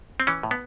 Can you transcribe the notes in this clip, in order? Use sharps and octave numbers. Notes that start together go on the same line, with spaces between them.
C4
E3 C#4
A2
B3